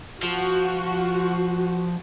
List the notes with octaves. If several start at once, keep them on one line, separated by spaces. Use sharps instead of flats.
F3 F#4